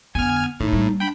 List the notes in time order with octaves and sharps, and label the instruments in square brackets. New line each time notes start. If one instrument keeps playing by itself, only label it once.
[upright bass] F2 D3 [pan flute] B3 [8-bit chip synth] G#5 F6
[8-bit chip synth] A2 [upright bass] D#3 [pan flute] D#4
[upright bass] G3 A#3
[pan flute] D4 [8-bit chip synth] G5 B5